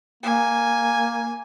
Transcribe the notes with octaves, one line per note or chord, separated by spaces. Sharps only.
A#3 G#5